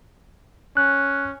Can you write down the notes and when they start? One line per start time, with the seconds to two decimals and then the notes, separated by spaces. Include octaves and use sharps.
0.77 C#4 F#6